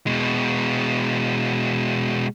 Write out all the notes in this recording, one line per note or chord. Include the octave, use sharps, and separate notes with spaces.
B2 G#3